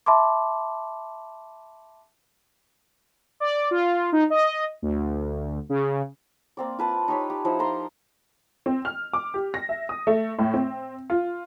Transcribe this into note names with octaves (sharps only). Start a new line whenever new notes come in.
E5 A5 B5 C6 D6
D5
F4
D#4
D#5
D2
C#3
A#3 C4 D5
F4 B4 A5
D#4 G4 C#5 B5
G4
F3 D#4 E4 C5
F4 A#4 A#5 C6
C4
F6
D6
G4
A#6
E5
D#6
A3
A2
C4
F4